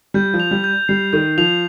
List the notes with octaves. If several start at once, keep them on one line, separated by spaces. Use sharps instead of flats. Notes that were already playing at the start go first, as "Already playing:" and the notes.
G3 G6
F3
F7
G3
G6
G3 C7
D#3 G6
F3 F7